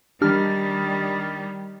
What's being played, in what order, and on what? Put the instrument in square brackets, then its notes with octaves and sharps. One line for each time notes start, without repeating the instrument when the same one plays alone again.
[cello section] D#3 G3 [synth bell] D4 G4 F6